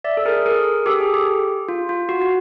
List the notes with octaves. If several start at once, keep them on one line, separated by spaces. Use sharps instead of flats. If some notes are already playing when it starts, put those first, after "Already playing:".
D5 E5
A4
G#4 A#4
G#4 A#4
G4 A4
G#4
G4
F4
F4
F#4
F#4